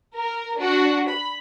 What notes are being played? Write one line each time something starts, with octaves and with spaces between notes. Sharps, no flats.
A#4
D4 F#4
B5